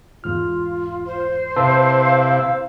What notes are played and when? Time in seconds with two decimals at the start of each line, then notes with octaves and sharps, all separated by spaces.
0.24 E2 G#2 F4 F6
1.06 C5
1.56 C3 E4 B4 F5 A5 C6